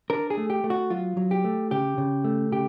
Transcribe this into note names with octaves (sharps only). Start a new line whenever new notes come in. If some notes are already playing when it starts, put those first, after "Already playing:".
D4 A#4
G#4
A3
G4
A3
F#4
F#3 F4
F#3
G4
A3
C#3 G4
C#3
A3
C#3 G4